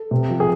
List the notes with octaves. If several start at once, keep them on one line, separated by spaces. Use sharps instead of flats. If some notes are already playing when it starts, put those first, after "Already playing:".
Already playing: A4
C3
F3
G#4